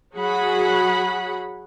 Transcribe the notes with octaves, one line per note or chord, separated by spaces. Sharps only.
F#3 F#4 G#4 F#5 B5